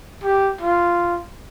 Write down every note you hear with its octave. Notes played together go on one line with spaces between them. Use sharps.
G4
F4